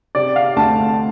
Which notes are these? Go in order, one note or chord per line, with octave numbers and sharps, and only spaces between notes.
C3 D5
F5
D2 A5